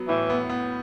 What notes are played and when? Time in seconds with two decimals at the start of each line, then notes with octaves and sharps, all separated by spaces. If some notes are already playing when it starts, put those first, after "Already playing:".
Already playing: F#3 B3
0.08 A2 E3
0.30 B3
0.49 B3